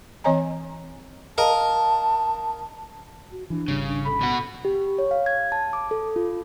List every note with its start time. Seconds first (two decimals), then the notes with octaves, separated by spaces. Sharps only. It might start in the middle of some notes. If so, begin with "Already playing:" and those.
0.24 E3 C4 C#5 D#5 G#5 A#5
1.38 A#4 D#5 F5 A5
3.32 F#4
3.50 E3 D4
3.68 G#1 C#3 G3 C#4
3.88 D4
4.05 A4 B5
4.21 B2 B3 F#4
4.65 G4
4.99 C#5
5.11 F5
5.26 G#6
5.52 A5
5.73 D6
5.91 A4
6.16 F4